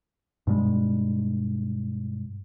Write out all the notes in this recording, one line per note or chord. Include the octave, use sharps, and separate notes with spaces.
G2 B2 G3 G#3